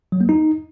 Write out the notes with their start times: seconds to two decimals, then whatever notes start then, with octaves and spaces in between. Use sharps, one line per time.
0.12 F#3
0.21 A#3
0.29 D#4